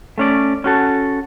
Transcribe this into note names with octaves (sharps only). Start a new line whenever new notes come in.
A3 C#4 D5
C#4 F#4 A4